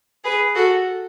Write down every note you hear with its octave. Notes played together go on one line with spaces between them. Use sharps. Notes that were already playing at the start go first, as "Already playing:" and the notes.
G#4 B4
F#4 A4